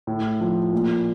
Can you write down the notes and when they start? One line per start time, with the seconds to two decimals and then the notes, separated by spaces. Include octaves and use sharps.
0.07 A2
0.40 F3
0.73 A#2